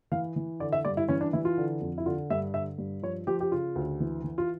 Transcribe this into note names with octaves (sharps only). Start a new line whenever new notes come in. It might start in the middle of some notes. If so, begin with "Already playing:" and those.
E3 F5
E3
D3 D5
E5
G2 D5
E4
E3 C#4
D4
E3 E4
F4
D3
F2
E4
D3 F4
G2 E5
D3 E5
G2
F3 C#5
F3 G4
G4
C#3 F4
D2
E3
E3
F4